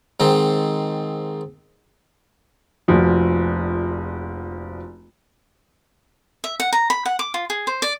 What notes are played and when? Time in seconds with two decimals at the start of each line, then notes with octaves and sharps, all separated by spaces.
0.20 G#2 D#3 C4
2.88 F1 A#1 F3 F#4
6.44 E5
6.60 F#5
6.73 A#5
6.90 B5
7.06 F#5
7.19 D6
7.34 F4
7.50 G#4
7.67 C5
7.82 D5